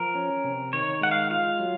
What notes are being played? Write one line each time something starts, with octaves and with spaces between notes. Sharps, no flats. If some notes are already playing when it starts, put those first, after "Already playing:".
Already playing: F3 A#4
C#4
C3
D#3 C#5
G#3 F#5
F5
F4 F5
F#3